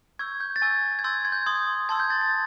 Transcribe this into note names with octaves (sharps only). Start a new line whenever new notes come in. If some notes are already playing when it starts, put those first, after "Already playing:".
C#6 E6 G6 G#6
G6
A6
G#5 C#6 E6 G6 G#6
G#6
C6 E6 G6 A6
G#6
G6
C6 D#6 G6 G#6
A5 C6 E6 G#6
G6
A6
A6